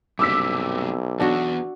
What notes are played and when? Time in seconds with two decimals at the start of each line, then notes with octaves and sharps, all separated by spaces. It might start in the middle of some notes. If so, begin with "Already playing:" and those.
0.19 B1 G2 C3 D6 E6 B6
1.20 E2 D4 F#4